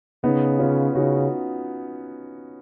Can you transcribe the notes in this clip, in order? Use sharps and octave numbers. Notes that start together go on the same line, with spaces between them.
C#3 B3 D#4
C#4 F4
C#3 D#4 F#4